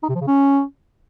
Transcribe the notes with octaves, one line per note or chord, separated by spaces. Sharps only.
D#4
C3
F3
C#3
C#4